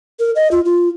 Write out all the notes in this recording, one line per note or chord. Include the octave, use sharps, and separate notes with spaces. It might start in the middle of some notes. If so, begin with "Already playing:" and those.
A#4
D#5
F4
F4